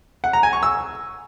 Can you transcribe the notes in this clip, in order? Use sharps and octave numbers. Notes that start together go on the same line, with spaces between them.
F#5
A#5
G#5
C#6
E6